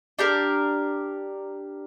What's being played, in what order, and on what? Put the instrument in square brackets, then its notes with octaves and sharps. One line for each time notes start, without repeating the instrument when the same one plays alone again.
[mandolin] D4 G4 A#4